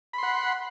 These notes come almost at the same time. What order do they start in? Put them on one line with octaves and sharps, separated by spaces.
B5 C6 F#5